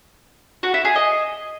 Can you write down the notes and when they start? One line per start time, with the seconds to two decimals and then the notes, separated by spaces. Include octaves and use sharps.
0.63 F#4
0.74 E4
0.85 G#4
0.95 D#5